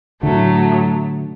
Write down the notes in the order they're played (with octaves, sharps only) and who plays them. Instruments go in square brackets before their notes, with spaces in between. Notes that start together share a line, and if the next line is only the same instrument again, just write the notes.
[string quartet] A2 F#3 A3 [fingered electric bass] D3